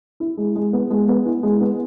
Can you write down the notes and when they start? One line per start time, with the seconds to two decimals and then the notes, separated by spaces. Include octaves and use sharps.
0.20 E4
0.37 G#3
0.55 G#3
0.73 B3
0.90 G#3
1.08 B3
1.26 E4
1.43 G#3
1.61 B3